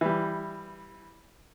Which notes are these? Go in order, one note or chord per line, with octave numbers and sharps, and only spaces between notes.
E3 G3